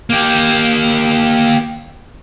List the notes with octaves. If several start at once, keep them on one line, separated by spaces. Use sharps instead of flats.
A#3 G4